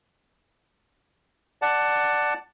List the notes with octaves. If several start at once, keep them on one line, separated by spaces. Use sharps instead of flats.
D5 F#5 A5